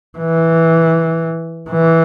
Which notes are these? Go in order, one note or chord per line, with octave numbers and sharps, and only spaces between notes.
E3
E3